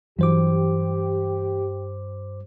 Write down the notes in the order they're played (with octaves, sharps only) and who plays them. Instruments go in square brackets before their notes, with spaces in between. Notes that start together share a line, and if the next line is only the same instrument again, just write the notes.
[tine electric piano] G2 C5 D6 [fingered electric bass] E3 F#3 [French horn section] G4